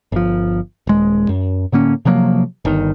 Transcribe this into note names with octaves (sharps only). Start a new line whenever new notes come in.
G1 F3
D#1 G#3
F#2
A2 D3 A#3 C#4
C3 F3 F#3 A#3
G1 D#3